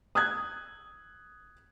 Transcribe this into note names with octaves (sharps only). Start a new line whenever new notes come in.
D#6 F#6 G#6